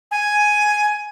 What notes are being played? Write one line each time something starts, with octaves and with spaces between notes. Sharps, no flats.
G#5